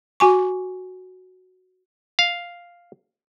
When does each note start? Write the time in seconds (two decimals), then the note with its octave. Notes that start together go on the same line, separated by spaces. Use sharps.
0.20 F#4 G#5 C#6
2.19 F5